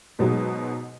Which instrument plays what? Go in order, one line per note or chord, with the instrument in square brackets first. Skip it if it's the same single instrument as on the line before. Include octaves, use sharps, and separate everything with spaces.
[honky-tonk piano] G#2 B2 F#3 G#3